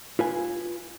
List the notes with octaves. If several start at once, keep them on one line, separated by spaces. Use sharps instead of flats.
F4 B4 G#5